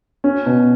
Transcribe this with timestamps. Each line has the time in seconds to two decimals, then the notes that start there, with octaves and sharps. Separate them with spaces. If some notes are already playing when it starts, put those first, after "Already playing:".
0.24 C#4
0.46 B2